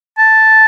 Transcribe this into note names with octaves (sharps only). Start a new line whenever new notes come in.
A5